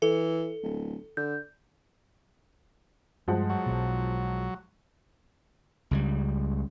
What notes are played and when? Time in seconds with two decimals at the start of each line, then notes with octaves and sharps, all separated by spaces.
0.02 E3 A4
0.63 D1
1.17 D3 G6
3.28 G2 F3 G#3 F#5
3.50 F#3
3.66 B1 B2
5.91 C#2 C#3 G3